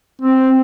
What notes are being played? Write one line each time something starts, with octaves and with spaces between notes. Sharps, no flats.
C4